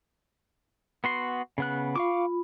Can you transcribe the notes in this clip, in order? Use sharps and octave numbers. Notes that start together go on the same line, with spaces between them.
B3 F#4 C6
C#3 B3 F#6
F4 F5 B5 C#6 D6